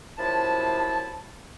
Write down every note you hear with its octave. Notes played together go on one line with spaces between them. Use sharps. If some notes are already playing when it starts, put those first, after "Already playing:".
F#2 C3 F3 E4 A5